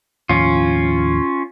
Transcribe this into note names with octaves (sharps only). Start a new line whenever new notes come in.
D#2 A2 F3 C#4 F4